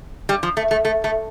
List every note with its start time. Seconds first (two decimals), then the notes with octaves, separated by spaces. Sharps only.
0.29 G3
0.43 F3
0.57 A3
0.71 A3
0.85 A3
1.04 A3